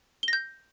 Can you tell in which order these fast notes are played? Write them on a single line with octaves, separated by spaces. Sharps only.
G7 A#6 G6